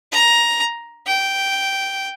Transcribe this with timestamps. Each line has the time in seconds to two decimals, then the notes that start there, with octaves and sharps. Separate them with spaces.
0.12 A#5
1.06 G5